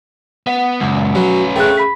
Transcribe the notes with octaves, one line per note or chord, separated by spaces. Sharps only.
B3 F#5
C#2 F#2
F#3 C#4 B4
C#3 A3 G5 F#6
B5 B6